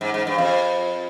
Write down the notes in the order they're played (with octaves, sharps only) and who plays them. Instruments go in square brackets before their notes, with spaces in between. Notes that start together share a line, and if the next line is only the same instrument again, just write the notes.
[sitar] G#2
G#2
G2
F2